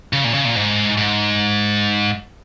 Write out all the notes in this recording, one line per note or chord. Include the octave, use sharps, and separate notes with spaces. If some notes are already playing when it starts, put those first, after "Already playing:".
C#3
A#2
C#3
A#2
G#2
G#2